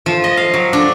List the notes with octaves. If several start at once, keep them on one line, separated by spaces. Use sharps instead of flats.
F3
D#5
F5
F#3
D4